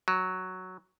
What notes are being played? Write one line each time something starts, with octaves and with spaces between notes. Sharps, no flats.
F#3